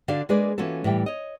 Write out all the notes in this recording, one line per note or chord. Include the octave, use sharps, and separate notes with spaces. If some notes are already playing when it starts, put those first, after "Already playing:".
D3 D4 F#4 F5
G#3 A#3 D4 G#4 B4 D5
E3 A#3 C#4 F4 F#4 A4
A2 E3 G3 G5
C#5 D#5